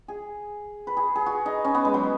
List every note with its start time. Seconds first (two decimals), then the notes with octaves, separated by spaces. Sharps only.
0.08 G#4
0.87 B4
0.97 G#4
1.15 G#4
1.26 F#4
1.46 D#4
1.65 C#4
1.75 B3
1.85 G#3
1.94 F#3